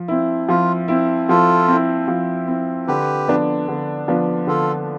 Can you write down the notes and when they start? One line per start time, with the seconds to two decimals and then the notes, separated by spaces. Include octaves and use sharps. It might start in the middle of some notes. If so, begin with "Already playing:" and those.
Already playing: F3
0.08 C4 E4
0.49 F3 F4
0.88 C4 E4
1.29 F3 F4 A4
1.68 C4 E4
2.08 F3
2.48 C4 E4
2.88 D3 G4 B4
3.28 F3 B3 D4
3.68 D3
4.08 F3 B3 D4
4.47 D3 F4 A4